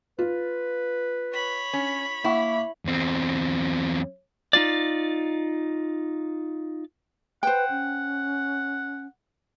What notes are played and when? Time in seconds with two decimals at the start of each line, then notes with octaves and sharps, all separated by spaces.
0.19 F4 B4
1.33 C#5 B5
1.73 C#4
2.24 A#3 E4 E5 F#5 C#6
2.85 E2 C4
4.53 D#4 F4 D5
7.43 B4 C5 F#5 G5
7.70 C#4